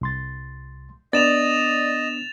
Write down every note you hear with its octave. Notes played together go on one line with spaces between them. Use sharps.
C2 C6 A6
B3 D4 D5 D#5 A6 E7 F7